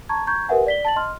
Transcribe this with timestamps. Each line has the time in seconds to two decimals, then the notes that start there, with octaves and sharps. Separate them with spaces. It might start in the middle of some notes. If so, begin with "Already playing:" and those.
0.09 A5 A#5 C#6 G#6
0.27 A#5 C#6 G6 G#6
0.48 G4 A#4 B4 E5 F#5 G#5
0.66 D5 B6 G7
0.85 A5 A6 F#7
0.96 D#5 C6 F6